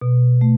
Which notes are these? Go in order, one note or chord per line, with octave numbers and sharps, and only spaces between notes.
B2
A3